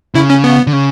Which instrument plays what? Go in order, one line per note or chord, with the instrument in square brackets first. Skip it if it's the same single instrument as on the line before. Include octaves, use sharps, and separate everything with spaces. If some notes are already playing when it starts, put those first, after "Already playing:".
[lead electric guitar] C#3 [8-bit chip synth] E4
[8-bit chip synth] C#4
B3
[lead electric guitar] D3
C#3